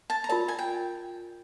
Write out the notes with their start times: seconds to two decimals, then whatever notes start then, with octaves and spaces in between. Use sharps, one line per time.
0.10 A5
0.24 A#5
0.29 F4 A#4 D5 A5
0.48 G#5
0.59 G5